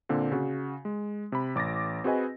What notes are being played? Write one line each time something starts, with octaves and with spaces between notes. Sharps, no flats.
A#2 D3 A#3 C4
C#3 F#4
G#3
C3 B5
A1 D6 A6 A#6
C4 F#4 G#4 B4 D#5 G#5